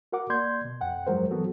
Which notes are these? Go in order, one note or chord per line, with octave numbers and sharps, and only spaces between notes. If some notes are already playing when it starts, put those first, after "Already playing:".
F#4 A#4 F#5 D6
A#3 D5 C6 G6 G#6
B2
F2 F#5 G5
G2 F3 F#3 G#3 A#4 C5
E3 F#3 B3 F#4 A4